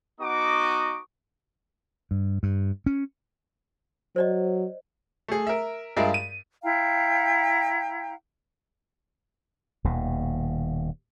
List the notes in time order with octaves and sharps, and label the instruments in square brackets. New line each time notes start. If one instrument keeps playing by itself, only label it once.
[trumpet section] B3 D#4 F#4 D#5 C#6 D6
[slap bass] G2
G2
C#4
[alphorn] F#3 [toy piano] C5 D5 D#5
[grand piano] A3 G#4
A#4 E5
G2 G#3 F4 G#4 A#4 E5
D#7
[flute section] E4 F5 G5 A#5
[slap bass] D#1 D#2 B2